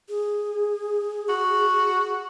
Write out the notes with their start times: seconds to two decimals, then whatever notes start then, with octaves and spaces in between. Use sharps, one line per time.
0.09 G#4
1.29 F#4